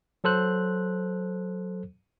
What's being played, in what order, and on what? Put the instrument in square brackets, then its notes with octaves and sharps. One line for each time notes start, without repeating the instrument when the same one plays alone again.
[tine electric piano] F#3 A4 C5 F#6